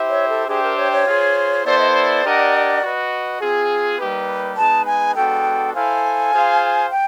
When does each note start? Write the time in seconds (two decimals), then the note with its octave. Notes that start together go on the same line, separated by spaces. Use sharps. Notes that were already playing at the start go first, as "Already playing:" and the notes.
Already playing: E4 G4 C5 E5
0.09 C#5
0.29 A4
0.48 D4 G4 G#4 C5 E5 G5
0.63 A#4
0.77 C#5
0.92 C#5
1.06 F4 G#4 C5
1.65 B3 E4 A4 C5 D5
1.79 D#5
1.92 D5
2.24 D4 G4 A#4 D#5 F#5
2.81 F#4 B4 D#5
3.41 C4 F4 G#4
3.98 G3 A#3 D#4 G4 B4
4.57 G#3 B3 D#4 G#4 B4 A5
4.86 G#5
5.15 G#3 B3 D4 F#4 A4 G5
5.74 E4 A4 C5 F5 G#5
6.33 F4 G#4 C5 F5
6.91 G5